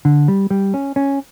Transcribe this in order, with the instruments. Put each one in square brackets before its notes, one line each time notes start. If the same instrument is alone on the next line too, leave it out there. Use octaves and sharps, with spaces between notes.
[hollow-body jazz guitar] D3
G3
G3
C#4
C#4